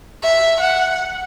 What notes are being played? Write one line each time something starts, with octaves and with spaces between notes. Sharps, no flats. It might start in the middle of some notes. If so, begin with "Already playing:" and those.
E5
F#5